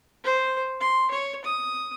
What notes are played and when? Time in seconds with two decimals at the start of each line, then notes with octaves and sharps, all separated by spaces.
0.24 C5
0.81 C6
1.10 C#5
1.44 D#6